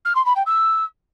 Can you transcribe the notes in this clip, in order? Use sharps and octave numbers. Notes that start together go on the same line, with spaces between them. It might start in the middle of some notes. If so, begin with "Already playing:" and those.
F6
C6
B5
G5
E6